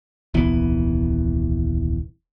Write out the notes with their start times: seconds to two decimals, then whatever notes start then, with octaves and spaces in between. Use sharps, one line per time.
0.34 D#1 C2 E3 B3